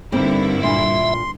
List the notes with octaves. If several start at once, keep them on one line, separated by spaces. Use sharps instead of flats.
G2 D3 A#3 C4 D#4 E4
A#2 E5 C6